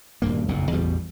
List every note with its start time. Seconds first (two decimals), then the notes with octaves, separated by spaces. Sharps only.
0.22 D#1 D2 G2 A#3
0.48 F#1 B1 F2 A#2
0.71 A1 E2 B2 G3